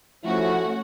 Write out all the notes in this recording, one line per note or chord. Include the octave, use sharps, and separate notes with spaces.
F3 A3 C#4 E4 F#4 F#5